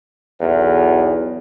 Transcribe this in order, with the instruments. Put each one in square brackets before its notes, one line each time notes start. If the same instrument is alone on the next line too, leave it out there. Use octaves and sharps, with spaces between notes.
[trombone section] B1 E2